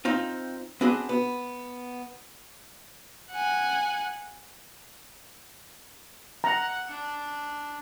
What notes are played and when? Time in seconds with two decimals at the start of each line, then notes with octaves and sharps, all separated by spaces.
0.05 C4 D#4 F4
0.81 B3 C4 D4 F#4 G#4
1.09 B3
3.32 F#5 G#5
6.44 F#5 A#5
6.90 D4